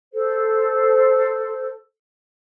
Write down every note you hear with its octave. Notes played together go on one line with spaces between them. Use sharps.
A4 C5